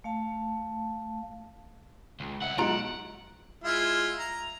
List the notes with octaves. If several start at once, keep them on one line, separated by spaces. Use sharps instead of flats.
A3 F5 A5
C#2
C2 E5 F#5
B1 G#3 F4 F#5 A#5 D7
G#3 E4 F4
A#5